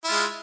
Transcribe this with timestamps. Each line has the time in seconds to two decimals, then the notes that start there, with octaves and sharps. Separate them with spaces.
0.04 E4
0.08 F4
0.12 G#3